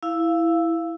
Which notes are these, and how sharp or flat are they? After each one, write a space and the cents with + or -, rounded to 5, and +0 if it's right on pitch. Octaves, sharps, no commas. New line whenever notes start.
E4 +0 F5 -10